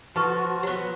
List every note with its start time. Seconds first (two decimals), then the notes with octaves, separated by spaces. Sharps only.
0.16 F3 F#4 A4 B4 A5 C#6
0.63 F#3 B3